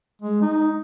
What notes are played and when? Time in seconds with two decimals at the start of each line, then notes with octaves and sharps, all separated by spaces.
0.21 G#3
0.42 D#4